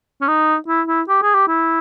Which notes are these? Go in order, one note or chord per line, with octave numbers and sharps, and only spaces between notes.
C#4
D#4
E4
E4
G4
G#4
G4
E4